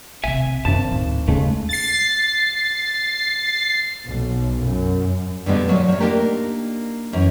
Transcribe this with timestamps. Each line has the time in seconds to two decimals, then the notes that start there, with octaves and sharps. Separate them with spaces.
0.24 B1 C3 E5 G#5
0.65 G#1 F#2 A5 A6
0.90 D2 A2
1.28 D#2 C#3 G#3 A3 C#4
1.69 A6 C7
4.07 B1
4.65 F#2
5.46 G2 B2 D3 G3 G#3 B3
5.68 A#2 F#3 G#3
5.88 A2 F3
6.00 A#3 D4 D#4 F4 G4 A#4
7.13 F#2 E3